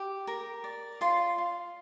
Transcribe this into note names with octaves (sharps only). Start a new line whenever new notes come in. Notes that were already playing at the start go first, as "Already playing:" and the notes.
Already playing: G4
A#4
D5
F4 C6
F4